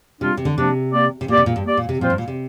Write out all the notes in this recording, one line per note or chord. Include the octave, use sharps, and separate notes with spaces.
C3 G3 D4 F4
C3
D3
C3 F3 A#3 D4
A#3 G4 D5
C3
A#2 A#3 G4 D5
C3
A#2
G2
A#3 G4 D5
A#2
C3
A#2 F3 C4 F4 C5
G2
A#2
C3